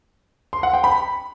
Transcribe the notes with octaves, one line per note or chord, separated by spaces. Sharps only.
C6
F#5
G5
B5